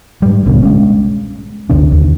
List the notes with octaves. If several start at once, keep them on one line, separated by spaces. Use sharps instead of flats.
G#2 G3
D#1 C2 B2 D3
G#3 C#4
G1 D2 C3 D4
D#2